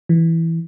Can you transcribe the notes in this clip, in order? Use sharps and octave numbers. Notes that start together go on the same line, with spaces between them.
E3